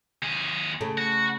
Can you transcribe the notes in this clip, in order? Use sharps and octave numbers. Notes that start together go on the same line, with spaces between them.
D#2 G#4
C#3 A3
F#4